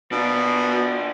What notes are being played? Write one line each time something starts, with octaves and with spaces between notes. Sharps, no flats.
B2 D4 F4